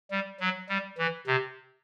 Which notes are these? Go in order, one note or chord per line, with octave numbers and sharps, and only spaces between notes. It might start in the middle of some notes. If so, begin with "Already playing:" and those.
G3
F#3
G3
E3
C3